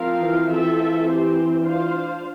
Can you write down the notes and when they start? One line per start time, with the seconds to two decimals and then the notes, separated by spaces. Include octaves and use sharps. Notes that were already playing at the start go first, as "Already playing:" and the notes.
Already playing: F3 C4 F4 A#4 F5
0.21 E3
0.48 E3 C4 F4 A4 E5
1.05 C4 G4 C5
1.63 D4 F4 C5 F5